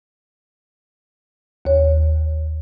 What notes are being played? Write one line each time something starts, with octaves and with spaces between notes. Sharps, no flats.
D#2 C#5